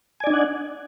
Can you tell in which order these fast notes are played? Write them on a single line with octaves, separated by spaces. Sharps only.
G#5 D5 D#4 D4 F#5